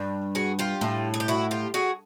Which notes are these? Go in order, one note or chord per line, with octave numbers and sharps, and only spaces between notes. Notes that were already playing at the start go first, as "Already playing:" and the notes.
Already playing: G2
F#4 G#4
F4 G4
A2
G#4
G4
E4 F#4
F4 G4
F#4 G#4